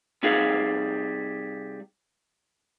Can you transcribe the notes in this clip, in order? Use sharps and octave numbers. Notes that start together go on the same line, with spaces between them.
C3 G3 D#4 G#4 F5 F#5